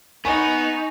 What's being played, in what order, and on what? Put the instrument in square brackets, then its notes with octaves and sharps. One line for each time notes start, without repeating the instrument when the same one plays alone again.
[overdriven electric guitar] B3 [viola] D#4 [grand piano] G#5 [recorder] C#6